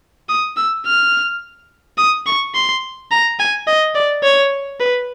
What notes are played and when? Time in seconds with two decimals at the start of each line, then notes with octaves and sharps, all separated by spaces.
0.29 D#6
0.57 E6
0.86 F6
1.98 D#6
2.26 C#6
2.55 C6
3.11 A#5
3.39 G#5
3.67 D#5
3.95 D5
4.23 C#5
4.80 B4